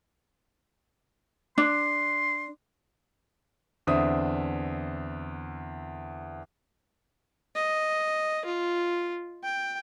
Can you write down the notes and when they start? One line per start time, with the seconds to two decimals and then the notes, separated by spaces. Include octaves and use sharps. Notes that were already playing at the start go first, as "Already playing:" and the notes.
1.58 D4 C6
3.87 E2 D3 C4 D4 E5 D#6
7.55 D#5
8.46 F4
9.43 G5